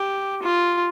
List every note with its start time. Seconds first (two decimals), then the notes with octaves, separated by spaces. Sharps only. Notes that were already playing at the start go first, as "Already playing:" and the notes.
Already playing: G4
0.42 F4